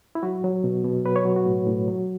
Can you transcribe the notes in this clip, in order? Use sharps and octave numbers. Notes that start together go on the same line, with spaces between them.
E4
F#3 F#4
F#3
B2
B2
F#3 B4
C#5
F#3
F#4
A2
A2
F#3